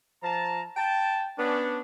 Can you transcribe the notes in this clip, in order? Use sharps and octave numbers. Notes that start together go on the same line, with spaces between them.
F3 A5 A#5
G5 A5
B3 C#4 D4